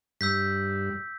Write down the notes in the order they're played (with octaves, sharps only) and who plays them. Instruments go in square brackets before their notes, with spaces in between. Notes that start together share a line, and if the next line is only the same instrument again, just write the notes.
[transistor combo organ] G2 [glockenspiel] E6 G6 B6